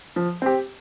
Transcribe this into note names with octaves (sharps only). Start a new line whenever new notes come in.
F3
C4 G4